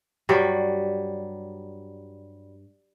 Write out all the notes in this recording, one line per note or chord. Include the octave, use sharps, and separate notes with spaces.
G2 F#3 G3